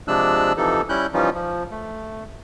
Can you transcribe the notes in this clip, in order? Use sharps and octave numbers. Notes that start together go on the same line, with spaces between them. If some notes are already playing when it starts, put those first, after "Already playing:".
C3 F3 G#3 D4 E6 F#6
C3 E3 F3 D#4 A4
G3 C#4 E4 F#6 G6
E3 F3 G3 C#4 D#4 F4
F3
A3